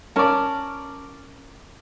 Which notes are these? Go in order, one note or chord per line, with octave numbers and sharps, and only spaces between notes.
C#4 A#4 D5 A5